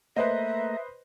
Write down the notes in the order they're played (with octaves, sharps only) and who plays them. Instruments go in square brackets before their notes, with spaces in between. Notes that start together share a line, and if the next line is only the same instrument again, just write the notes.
[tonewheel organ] A3 A#3 A#5 [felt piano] B4 C5 D#5 [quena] E5